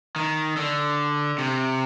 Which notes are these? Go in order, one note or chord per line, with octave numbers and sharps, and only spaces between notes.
D#3
D3
C3